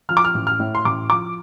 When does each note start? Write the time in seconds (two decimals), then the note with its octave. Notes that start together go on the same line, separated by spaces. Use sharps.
0.09 F3 F6
0.17 D6
0.24 F6
0.34 A1
0.47 F6
0.59 A2
0.75 C6
0.85 A1 D6
1.10 F3 D6